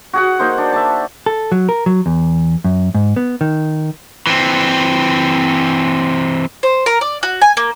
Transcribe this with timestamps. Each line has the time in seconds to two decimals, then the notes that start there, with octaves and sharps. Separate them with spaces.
0.13 F#4 G#4 F#5
0.39 A#3 D#4 C5
0.58 D4
0.72 E5 A5
1.26 A4
1.52 F#3
1.69 A#4
1.86 F#3
2.06 E2
2.65 F#2
2.95 G#2
3.16 B3
3.41 D#3
4.27 E3 C4
6.63 C5
6.86 A#4
7.01 D5
7.23 F#4
7.42 G#5
7.57 A#3